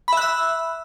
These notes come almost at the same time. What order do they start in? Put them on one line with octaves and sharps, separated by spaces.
B5 E5 F#6 E6